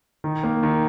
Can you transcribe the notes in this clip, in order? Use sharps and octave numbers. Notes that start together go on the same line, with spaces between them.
D#3
A#3
D#3